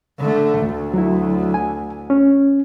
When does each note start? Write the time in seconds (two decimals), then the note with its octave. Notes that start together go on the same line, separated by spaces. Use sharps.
0.18 D3 A3
0.58 D2
0.94 F#3 E4
1.54 G#5
2.10 C#4